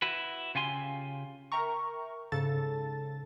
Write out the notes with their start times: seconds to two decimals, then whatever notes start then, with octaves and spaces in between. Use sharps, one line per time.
0.02 E4 F#4 B4
0.55 C#3 F4 G4 G#5 C6
1.52 A#4 E5 G5 A#5 C#6
2.32 G#2 C#3 A4 A5 A6